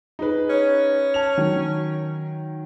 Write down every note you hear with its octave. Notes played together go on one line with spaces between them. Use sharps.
D#4 G#4 B4
C#4
A5 F7
D#3 F#3